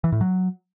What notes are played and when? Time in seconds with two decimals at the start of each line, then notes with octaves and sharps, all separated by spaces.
0.04 E3
0.12 A2
0.21 F#3